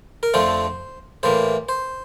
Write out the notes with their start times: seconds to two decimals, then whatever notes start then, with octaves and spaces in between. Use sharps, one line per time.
0.23 A#4
0.34 F2 D3 F3 A3 C4 C5
1.23 A2 E3 A#3 C5
1.69 C5